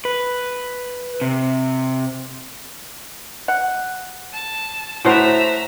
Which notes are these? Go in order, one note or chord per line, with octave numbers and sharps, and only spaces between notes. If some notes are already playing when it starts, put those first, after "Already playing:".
B4
C3
F#5
A5
A2 F#4 C5 E5 F#5 A#5